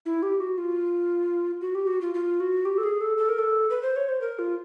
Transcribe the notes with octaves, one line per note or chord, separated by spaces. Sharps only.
E4
G4
F#4
F4
F#4
G4
F#4
F4
F4
F#4
G4
A4
G#4
A4
A4
A#4
A4
B4
C5
C#5
C5
A#4
F4